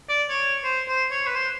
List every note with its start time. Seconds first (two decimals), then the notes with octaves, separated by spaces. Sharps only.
0.09 D5
0.30 C#5
0.64 C5
0.88 C5
1.11 C#5
1.27 B4
1.35 C5